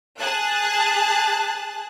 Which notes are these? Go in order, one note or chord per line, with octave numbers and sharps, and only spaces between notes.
G#4 A5 F#6